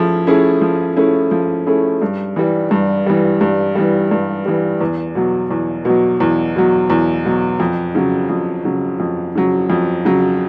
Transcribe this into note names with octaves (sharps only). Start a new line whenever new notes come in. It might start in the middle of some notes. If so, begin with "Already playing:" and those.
Already playing: F3 A3 C#4 E4 G#4
A3 C#4 E4 G#4
F3
A3 C#4 E4 G#4
F3
A3 C#4 E4 G#4
G2
E3 G3
G2
E3 G3
G2
E3 G3
G2
E3 G3
E2
B2 F#3
E2
B2 F#3
E2
B2 F#3
E2
B2 F#3
F2
C#3 F#3
F2
C#3 F#3
F2
C#3 F#3
F2
C#3 F#3